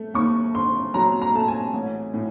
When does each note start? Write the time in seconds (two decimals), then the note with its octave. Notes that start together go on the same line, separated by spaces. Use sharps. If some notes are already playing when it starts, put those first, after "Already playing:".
Already playing: A3
0.14 D#2 C#6
0.54 D3 C6
0.94 F#3 A#5
1.22 A#5
1.34 A3 A5
1.48 G#5
1.73 A1
2.14 A2